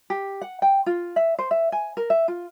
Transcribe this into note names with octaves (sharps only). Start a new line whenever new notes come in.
G4
F#5
G5
F4
E5
C5
E5
G#5
A#4
E5
F4